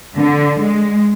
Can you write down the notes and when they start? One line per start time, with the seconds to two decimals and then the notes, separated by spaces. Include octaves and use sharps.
0.17 D3
0.61 G#3